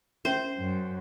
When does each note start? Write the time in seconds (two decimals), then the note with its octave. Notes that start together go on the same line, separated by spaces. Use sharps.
0.25 C#4 C5 E5
0.59 F#2